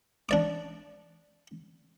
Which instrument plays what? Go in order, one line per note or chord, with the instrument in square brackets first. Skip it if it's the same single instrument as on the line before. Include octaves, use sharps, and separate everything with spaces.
[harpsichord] D4 D5 D6